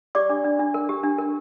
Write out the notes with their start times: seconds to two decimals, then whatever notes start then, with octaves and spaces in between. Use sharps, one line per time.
0.15 G4 D5 D6
0.30 D4
0.44 D4
0.59 D4
0.74 A#4
0.89 G4
1.03 D4
1.18 A#4